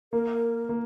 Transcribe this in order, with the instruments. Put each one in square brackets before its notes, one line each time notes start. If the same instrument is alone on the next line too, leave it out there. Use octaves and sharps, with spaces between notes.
[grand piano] A#3 [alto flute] A#4
[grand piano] A#3